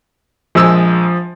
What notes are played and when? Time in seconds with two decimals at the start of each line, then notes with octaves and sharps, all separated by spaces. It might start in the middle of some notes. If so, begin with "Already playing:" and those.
0.55 A#1 F3 G#3 E6